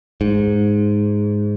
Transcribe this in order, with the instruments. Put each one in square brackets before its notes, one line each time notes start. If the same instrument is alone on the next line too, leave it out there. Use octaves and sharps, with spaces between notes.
[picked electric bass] G#2